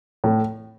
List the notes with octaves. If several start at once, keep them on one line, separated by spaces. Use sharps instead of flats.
A2